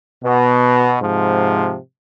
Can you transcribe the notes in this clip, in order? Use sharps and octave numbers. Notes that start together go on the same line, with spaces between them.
B2
G#2 C3 F3